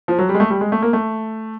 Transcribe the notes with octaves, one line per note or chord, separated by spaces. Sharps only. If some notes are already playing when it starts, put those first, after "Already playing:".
F3
F#3
G3
G#3
A3
G3
G#3
A3
A#3
A3